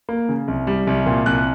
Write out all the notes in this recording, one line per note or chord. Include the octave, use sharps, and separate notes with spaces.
A#3
C#3
C2
G3
C2
A#2
C2 F#6